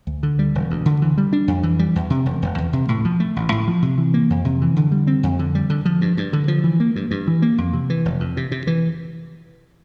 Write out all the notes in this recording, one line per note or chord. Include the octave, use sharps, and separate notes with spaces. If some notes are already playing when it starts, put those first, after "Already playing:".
D2
D3
G3
E1
D2
D3
E3
G3
D4
F2
E3
G3
E2
C3
E1
E1
E2
C3
A2
F3
A3
A1
A2
F3
C3
E3
A#3
F2
C3
E3
D3
G3
C4
F2
D3
G3
D3
F3
G2
G2
D3
F3
E3
A#3
G2
G2
E3
A#3
F2
C3
E3
F1
F2
C3
C3
E3